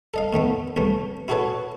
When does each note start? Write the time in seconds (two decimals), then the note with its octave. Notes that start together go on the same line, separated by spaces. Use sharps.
0.14 A4 D#5 F5
0.33 A2 D#3 A3 B3
0.76 C2 A2 E3 A3
1.28 E4 F#4 G#4 A4 B4 C#5